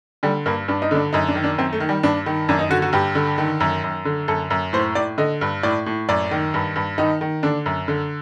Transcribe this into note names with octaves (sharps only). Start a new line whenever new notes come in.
D3 G3
G2 A#3
G2 D4
D#4
D3 D4
F#2 D#4
D4
D#3
D4
F#2 C4
A3
D#3
G3
G2 D4
D#3
F#2 D4
D#4
D3 F#4
F#4
G2 G4
D3
D#3
F#2
F#2
D3
F#2 A4
F#2
A2 C5
A2 D5
D3 D#5
G2
A2 D5
A2
F#2 D5
D#3
G2
G2
D#3 D#4
D#3
D3 D4
F#2
D3